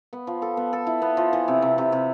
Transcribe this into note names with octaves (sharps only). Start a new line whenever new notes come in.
B3
F3
A4
B3
A4
E4
B3
F3
E3
C3
C3
C3
C3